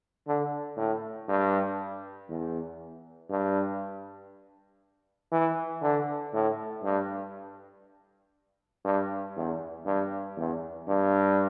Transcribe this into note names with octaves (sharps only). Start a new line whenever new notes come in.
D3
A2
G2
E2
G2
E3
D3
A2
G2
G2
E2
G2
E2
G2